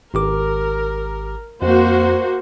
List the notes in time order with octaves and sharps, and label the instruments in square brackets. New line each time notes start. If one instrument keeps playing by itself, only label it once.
[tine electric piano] G#1 G4 D6 [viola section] A#4
[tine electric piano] F2 [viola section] A#3 F#4 C5